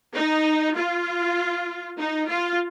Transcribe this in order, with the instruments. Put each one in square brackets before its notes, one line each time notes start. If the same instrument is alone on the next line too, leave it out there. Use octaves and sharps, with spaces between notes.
[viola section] D#4
F4
D#4
F4